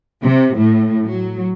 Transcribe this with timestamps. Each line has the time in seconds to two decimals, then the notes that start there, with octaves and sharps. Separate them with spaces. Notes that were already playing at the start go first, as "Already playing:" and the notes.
0.21 C3
0.55 A2
1.07 F#3